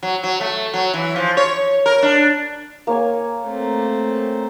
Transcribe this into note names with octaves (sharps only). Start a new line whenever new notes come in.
F#3
F#3
A3
F#3
E3
F3
C#5
A#4
D4
A#3 C#5 G#5
A3 C4